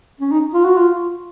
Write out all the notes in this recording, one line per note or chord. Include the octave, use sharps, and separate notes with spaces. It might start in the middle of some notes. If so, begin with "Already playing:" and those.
C#4
D#4
F4
F#4
F4